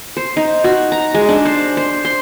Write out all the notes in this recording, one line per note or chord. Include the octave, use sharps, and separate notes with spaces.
C5
D#4
F#4
A#5
G#3
D4
C5
C5
C6